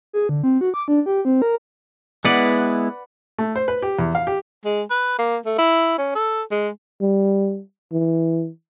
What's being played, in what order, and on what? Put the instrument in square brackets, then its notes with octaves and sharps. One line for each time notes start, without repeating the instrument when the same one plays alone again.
[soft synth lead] G#4
D3
C4
F#4
D6
D4
G4
C4
A#4
[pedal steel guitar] G#3 B3 E4 [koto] B4 D5 F#5
[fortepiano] A3
C5
B4
G4
E2
F5
G4
[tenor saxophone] G#3
B4
A#3
A3
E4
C#4
A4
G#3
[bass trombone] G3
E3